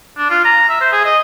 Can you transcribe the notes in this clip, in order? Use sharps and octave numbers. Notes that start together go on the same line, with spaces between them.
D4
F4
A#5
E5
C5
G#4
D#5